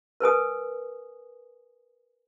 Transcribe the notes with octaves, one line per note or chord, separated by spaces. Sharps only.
A#4 B4 G#5 D#6